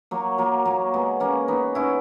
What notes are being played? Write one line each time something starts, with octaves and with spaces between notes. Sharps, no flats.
F#3 A#3
F#3 A#3
F#3 A#3
G#3 B3
A#3 C#4
B3 D#4
C#4 E4